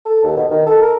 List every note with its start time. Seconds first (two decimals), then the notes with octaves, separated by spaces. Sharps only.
0.06 A4
0.23 D#2
0.37 B2
0.51 D#3
0.67 A4
0.82 A#4